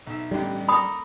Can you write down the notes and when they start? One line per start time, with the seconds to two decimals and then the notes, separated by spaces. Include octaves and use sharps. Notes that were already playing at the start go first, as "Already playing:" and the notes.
0.07 B1 E5
0.31 A1 B2 D3 G3
0.68 A#3 A4 A#5 B5 D#6